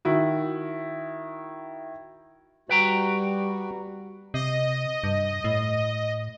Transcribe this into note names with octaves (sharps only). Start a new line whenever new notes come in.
D#3 E4 F#4
G3 F#4 B4 G5 A#5
C3 D#5
G2
A2